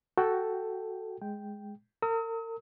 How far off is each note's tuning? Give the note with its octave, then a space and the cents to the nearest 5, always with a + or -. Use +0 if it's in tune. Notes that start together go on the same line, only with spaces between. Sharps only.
F#4 +10 A4 +0 G5 +0
G#3 +0 G5 +0
A#4 -40 D#6 +45